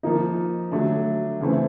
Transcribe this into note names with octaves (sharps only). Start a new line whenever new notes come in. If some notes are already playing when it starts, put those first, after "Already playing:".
F3 A#3 D#4
D3 F#3 A3 D4
C#3 E3 A3 C4